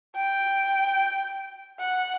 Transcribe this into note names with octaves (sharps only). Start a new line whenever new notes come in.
G5
F#5